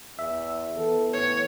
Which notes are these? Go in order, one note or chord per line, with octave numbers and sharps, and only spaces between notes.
E2 E5
E3 B3 A4
A2 C#5